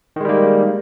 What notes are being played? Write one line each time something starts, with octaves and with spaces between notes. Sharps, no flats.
D#3 G3 G#3 A#3